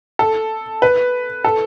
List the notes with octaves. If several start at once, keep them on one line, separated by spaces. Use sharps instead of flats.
A4
B4
A4